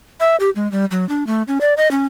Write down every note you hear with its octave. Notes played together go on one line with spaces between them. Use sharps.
E5
G4
G#3
G3
F#3
D4
A3
C#4
D5
D#5
C#4